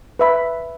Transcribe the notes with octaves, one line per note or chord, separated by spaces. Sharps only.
B4 E5 B5